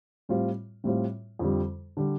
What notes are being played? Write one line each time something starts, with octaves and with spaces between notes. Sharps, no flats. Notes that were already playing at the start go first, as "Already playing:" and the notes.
A2 G3 C4 F4
A2 G3 C4 F4
F2 D3 G3
D3 G3